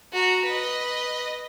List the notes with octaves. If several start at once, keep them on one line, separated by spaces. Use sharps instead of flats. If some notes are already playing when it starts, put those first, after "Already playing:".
F#4 A#5
B4 D#5